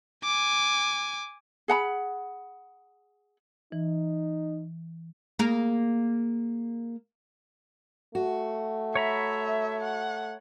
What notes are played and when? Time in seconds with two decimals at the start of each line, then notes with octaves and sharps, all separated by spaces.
0.24 G#5 D6
1.68 G#4 F#5 A#5 B5
3.72 E3 D#4
5.39 A#3 G#4 A#4
8.15 A3 F#4
8.95 C#5 E5 A#5 B5
9.83 F#5